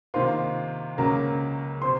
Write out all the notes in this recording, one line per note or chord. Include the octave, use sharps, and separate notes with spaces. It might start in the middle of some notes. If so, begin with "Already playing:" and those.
C3 D#3 A#3 F4 C5 C6
C#2 C#3 F#3 A#3 A#4 A#5
C3 C5 C6